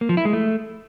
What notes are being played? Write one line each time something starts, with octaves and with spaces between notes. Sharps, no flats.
A#3
F3
E4
G#3
A3